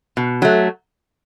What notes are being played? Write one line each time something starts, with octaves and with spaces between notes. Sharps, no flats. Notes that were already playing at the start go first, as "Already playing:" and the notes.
B2
F#3 A3